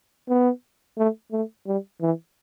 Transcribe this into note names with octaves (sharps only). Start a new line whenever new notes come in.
B3
A3
A3
G3
E3